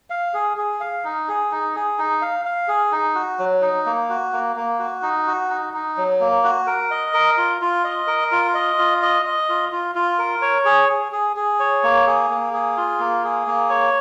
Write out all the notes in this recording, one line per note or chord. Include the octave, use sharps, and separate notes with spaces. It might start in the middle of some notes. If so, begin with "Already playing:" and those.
F5
G#4
G#4
F5
D#4
G#4
D#4
G#4
D#4
F5
F5
G#4
D#4
F#4
F#3
D#4
A#3
F#4
A#3
A#3
F#4
D#4
F#4
D#4
D#4
F#3
A#3
F#4
A#4
D#5
A#4
F4
F4
D#5
A#4
F4
D#5
F4
D#5
D#5
F4
F4
F4
A#4
C#5
G#4
G#4
G#4
G#4
C#5
A#3
G#4
A#3
G#4
F4
A#3
G#4
A#3
C#5